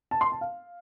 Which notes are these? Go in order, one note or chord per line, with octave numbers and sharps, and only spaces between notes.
A5
C6
A5
F5